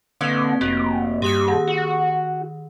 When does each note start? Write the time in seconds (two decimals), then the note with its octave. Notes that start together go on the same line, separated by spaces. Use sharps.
0.21 D3 A#3 C4 B4
0.61 F1 A#3 F#4
1.22 G2 G4 D#6 F#6
1.48 D#3
1.67 F#4